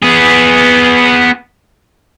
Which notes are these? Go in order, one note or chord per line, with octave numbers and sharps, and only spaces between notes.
B3 G#4